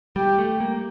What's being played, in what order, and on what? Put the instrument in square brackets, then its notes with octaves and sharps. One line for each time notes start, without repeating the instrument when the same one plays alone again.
[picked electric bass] G3 [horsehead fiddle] G4
[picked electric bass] A3
A#3